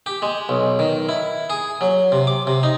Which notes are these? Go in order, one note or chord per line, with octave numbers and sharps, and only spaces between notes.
G4
G#3
B1
D#3
E4
G#4
F#3
C3
D6
C3
D#4